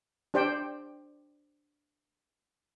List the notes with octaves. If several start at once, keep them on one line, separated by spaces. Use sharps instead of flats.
D4 G4 C5 D5 G5